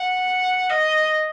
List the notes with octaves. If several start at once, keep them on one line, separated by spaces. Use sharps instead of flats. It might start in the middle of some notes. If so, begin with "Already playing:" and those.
Already playing: F#5
D#5